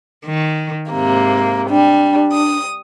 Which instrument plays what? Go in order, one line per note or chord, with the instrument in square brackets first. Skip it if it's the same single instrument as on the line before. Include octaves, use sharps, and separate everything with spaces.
[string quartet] D#3
G#2 C3 A#3
[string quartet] G3 [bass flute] D4
[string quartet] D#6